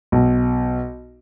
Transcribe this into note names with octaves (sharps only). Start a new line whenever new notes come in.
B1